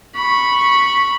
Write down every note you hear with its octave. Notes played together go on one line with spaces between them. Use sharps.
B5 C#6